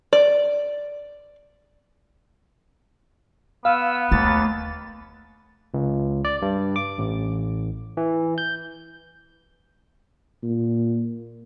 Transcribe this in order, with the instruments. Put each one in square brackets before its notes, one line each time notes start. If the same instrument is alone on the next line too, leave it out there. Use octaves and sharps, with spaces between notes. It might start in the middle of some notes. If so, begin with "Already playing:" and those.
[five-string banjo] D5
[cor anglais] B3 [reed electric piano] F5 [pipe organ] E6
[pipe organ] D#2 A6 [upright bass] A3
[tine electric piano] C#2
D5
G2
D6
A1
E3
G6
[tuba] A#2